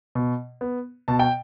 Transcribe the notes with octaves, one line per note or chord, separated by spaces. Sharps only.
B2
B3
B2 A5
G5